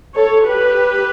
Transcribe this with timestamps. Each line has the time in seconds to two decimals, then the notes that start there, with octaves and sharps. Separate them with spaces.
0.15 A4 C#5
0.47 G4 B4